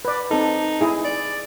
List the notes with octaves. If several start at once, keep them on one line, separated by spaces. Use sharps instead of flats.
B4 D5
C4 D#4 A4
E4 G#4
D5